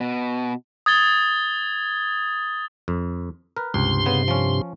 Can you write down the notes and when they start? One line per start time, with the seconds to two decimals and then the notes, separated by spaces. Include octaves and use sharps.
0.01 B2
0.86 D#6 G#6 A6 G7
2.88 F2
3.57 A#4 B4
3.74 C#2 G2 C3 C6
4.06 C#3 B3
4.28 F3 C#4